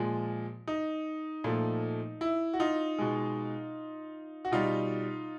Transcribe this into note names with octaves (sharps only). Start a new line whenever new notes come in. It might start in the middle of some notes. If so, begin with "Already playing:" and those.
Already playing: A#2 F3 G#3
D#4
A#2 F3 A3
E4
F#4
D#4 F4
B2 G#3
F#4
B2 G3 D#4 F4